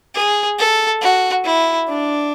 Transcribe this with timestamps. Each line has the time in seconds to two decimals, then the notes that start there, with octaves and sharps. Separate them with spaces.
0.15 G#4
0.58 A4
1.01 F#4
1.45 E4
1.88 D4